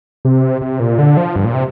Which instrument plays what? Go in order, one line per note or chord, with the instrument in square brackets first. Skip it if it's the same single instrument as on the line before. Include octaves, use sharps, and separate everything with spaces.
[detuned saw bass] C3
C3
A#2
D3
F3
G2
A#2
C3